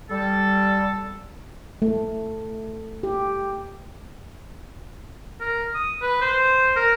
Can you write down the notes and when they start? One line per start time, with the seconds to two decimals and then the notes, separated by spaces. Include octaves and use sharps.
0.10 G3 A4
1.82 A3
3.03 G4
5.40 A#4
5.74 D#6
6.02 B4
6.22 C5
6.76 A#4